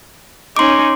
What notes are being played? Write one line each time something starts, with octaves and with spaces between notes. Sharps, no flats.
C#4 D#4 C6 D6